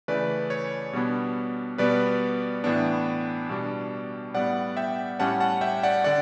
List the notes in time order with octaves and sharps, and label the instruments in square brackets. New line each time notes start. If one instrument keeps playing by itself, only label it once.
[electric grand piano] C#3 E3 A3 B4 D5
C#5
B2 G3 B3 D4
B2 G3 B3 B4 D5
A2 E3 B3 D4
B2 G3 D4
A2 G3 B3 D5 F#5
E5 G5
A2 G3 C#4 F#5 A5
F#5 A5
E5 G5
D5 F#5
D3 D5 F#5